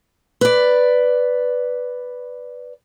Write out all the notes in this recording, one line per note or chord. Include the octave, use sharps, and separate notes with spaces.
B4 D5